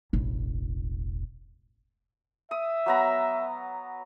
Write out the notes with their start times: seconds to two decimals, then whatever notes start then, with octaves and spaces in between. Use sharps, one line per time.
0.13 E1 A1
2.51 E5 D#6
2.86 F#3 B3 A#5